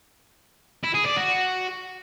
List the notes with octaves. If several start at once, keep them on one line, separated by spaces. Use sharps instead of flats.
E4
G#4
D5
F#4